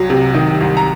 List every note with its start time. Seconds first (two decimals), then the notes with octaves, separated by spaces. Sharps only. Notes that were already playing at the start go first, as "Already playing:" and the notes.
Already playing: C2 F#3
0.10 C3
0.34 D#3
0.61 C2
0.77 A#5